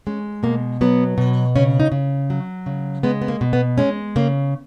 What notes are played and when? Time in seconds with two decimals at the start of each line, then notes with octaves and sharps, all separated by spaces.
0.07 G#3 C#4
0.43 B2 A#3
0.81 F#3 B3
1.18 B2
1.56 C#3 C#4
1.80 D#4
1.92 C#3
2.30 F#3
2.66 C#3
3.03 G#3 B3
3.22 B3
3.28 A#3
3.41 B2
3.53 B3
3.78 G#3 C#4
4.16 C#3 A#3